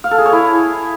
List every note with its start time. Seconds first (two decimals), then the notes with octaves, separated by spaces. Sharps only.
0.04 F5
0.11 A4
0.18 G#4
0.26 C#5
0.33 E4